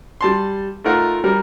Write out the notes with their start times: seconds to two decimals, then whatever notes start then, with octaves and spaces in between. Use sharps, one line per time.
0.21 G3 A5 C6
0.84 A3 D#4 F4 A#4 F#5
1.24 G3 A#4